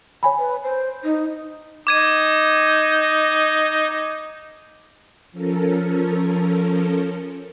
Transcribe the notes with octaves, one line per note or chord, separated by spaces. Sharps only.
C#5 G#5 B5
B4
C5
D#4
D#4 D6 G#6 D#7
F3 C#4 A4 A#4